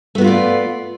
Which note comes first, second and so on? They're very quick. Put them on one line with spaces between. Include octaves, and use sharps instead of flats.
A3 B3 F#4 F4 D5